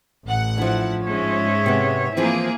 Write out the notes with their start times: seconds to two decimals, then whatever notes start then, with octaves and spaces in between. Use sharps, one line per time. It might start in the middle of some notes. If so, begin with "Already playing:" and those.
0.25 A1 F#5
0.58 F3 D4 E4
1.06 G#2 G#3 C#4 C#5 E5
1.66 C3 B3
2.17 E3 F3 A#3 C4 E4 G#4